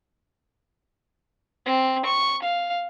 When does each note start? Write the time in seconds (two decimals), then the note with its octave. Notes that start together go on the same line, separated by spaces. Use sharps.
1.66 C4
2.05 C#6
2.42 F5